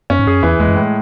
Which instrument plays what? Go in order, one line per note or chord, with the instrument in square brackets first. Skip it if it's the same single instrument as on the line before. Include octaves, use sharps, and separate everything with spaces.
[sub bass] F#2 [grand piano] C#4
[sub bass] G#2
[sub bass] F#2 [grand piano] G#4
[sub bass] E2 [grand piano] E3
[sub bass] E2 [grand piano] G#3
[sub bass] F#2
[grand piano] A2